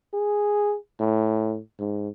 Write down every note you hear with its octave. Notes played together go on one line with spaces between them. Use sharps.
G#4
A2
G#2